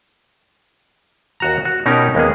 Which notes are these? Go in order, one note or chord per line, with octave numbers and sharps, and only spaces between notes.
D#2 F#4 A#5
F#4
B2 C#4 D#4 G4 A#4
D#2 G#3 A#3 B3 G#4